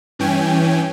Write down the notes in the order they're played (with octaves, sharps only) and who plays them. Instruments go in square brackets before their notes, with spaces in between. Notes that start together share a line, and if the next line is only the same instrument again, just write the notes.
[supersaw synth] G2 E3 C#4 G5 G#5